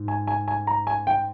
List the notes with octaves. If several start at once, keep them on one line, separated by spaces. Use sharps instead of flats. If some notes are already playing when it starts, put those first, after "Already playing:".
Already playing: G#2
G#5
G#5
G#5
A#5
G#5
G5